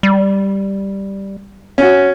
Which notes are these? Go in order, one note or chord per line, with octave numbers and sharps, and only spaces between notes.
G3
C#4 F#4